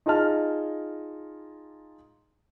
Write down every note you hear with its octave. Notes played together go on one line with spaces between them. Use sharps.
D#4 F4 G#4 D#5 A5 F6